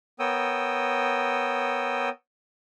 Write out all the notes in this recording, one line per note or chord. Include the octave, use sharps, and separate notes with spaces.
B3 A#4 C#5 G5 D#6 E6